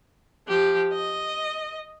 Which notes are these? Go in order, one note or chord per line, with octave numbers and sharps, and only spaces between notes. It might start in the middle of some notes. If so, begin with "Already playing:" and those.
F3 G4
D#5